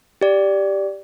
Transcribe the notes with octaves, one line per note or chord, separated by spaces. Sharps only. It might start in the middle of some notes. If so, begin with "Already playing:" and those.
G4 D5